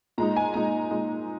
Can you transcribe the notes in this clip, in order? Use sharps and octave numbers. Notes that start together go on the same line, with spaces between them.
A#2 G#3 D#4 A#5
G#5
A#2 G#3 D#4 A#5
A#2 G#3 D#4